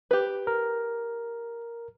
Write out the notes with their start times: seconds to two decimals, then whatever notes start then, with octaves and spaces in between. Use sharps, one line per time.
0.11 G4 B4
0.47 A#4